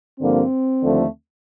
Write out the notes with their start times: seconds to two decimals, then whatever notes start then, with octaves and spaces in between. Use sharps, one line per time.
0.20 G2 D3 F3 A#3 C4
0.82 D#2 D3 F3 A3